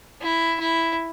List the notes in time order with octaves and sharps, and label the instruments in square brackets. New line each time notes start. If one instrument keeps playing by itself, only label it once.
[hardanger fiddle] E4
E4